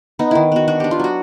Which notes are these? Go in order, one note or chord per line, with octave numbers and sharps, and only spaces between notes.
B3 D#4
D#3 E4
B3 F#4
D4 F#4
D4 G4
F4
F#3 F#4